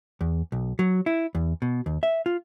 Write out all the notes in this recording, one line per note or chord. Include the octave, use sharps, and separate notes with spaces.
E2
B1
F#3
E4
E2
B2
D#2
E5
F4